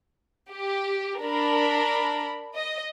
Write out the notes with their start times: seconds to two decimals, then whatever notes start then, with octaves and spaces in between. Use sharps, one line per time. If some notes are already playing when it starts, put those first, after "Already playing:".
0.52 G4
1.20 D4 A#4 B5
2.56 D#5